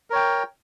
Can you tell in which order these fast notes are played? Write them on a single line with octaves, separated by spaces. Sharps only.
A#4 C#5 G5